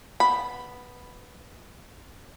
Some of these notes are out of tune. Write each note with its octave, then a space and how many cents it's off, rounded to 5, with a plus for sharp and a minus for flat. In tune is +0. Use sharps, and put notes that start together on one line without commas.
B3 +0 B5 +0